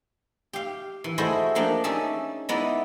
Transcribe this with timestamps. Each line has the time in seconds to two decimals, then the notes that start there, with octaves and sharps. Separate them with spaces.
0.53 G4 F5
1.04 E3
1.18 A3 E4 F#4 G#4 C5 D#5
1.55 F3 A#3 D4 G4
1.84 C#4 D#4 G#4 D5 E5 A5
2.49 G#3 B3 D#4 E4 D5